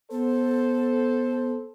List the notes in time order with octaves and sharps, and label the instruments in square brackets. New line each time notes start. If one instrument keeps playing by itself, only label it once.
[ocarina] B3 [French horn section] A4 C5